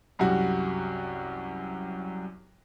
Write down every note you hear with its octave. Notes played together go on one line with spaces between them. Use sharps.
C2 F#2 G3 F#4